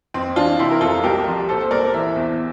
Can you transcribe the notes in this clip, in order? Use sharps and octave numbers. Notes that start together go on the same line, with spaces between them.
F2 C4
E3 D4 F4
C3 C4 E4
A#4
F2 F4 A4
C2 G4 A#4
F3
A#2 A4 C5
C5
C2 A#4 D5
E3 C5 E5
E2